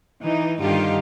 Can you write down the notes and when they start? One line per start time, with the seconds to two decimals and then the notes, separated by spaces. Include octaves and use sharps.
0.23 E3 D#4
0.58 G2 D3 D#3 D#4 F4 G4